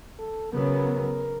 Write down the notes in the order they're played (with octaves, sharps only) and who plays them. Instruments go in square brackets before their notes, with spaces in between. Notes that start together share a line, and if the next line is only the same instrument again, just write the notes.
[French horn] A4
[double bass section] C#3 F#3 B3 [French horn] A#4